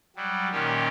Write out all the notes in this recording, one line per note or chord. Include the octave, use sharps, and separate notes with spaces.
F#3 G3
A#2 D#3 C#4 G4